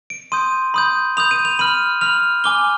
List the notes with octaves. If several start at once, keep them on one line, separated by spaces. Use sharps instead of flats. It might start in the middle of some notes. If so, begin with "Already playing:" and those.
D7
C6 D#6 G6 D#7
B5 D#6 G6
B5 D#6 G6 F7
D#7
F7
B5 F6 D#7
B5 F6 F7
G#5 D6 F6 G7